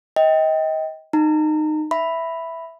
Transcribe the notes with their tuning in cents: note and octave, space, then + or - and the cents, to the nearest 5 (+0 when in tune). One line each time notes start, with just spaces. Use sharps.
D#5 +30 G5 +0
D#4 -20 A#5 -30
E5 +0 B5 +0